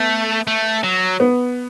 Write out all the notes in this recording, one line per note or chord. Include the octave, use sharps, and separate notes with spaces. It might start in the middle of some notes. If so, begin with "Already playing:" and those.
Already playing: A3 B3
A3
F#3
B3